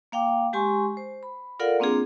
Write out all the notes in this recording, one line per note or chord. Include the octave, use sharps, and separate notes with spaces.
A#3 F5 G5 D6
G#3 G4 G#5 C6 C#6
C5
B5
F4 A4 A#4 D5 F5 F#5
A#3 C4 D4 F4 G#4